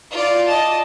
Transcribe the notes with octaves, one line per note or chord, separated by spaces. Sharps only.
F4 D5
D#5 A5